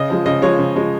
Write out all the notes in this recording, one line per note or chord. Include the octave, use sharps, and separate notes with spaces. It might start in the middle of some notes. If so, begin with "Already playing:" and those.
Already playing: C#3 D#5
F3 G#3
C#3 D#5
F3 G#3 C#5
C#3
F3 G#3